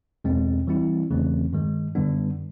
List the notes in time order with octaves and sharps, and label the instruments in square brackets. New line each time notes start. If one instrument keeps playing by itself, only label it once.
[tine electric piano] E2 B2 G#3 C4
E3 G3 C4 E4
E2 C#3 E3 A3 C4
G2 D#3 G#3
F#2 D3 G3 B3 D4